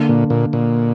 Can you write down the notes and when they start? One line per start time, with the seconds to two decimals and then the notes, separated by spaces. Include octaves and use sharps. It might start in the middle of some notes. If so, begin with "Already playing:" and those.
Already playing: D3 A#3 D4
0.09 A#2
0.30 A#2
0.53 A#2